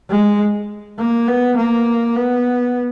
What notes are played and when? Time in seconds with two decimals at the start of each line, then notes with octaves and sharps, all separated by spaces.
0.10 G#3
0.99 A#3
1.28 B3
1.57 A#3
2.16 B3